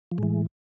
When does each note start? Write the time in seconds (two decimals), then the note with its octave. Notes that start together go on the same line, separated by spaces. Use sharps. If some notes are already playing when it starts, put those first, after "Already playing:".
0.12 F3
0.18 A2 E3 G#3